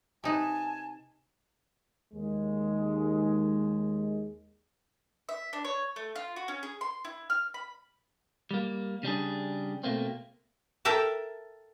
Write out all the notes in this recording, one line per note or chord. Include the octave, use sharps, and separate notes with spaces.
C3 D#4 B4 G#5 A5
D#2 G#3
E5
D4
C#5
A3
F4
F#4
C#4
G#4
C6
E4
F6
B5
G3 A#3
C#3 G3 D4 G#4
B2 A3 A#3 C4
A4 A#4 E5 G5 A5